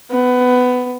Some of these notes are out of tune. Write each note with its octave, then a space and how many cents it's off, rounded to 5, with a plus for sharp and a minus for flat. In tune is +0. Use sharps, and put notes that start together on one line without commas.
B3 +15